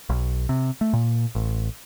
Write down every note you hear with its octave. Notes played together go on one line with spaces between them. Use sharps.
B1
C3
A3
A#2
A1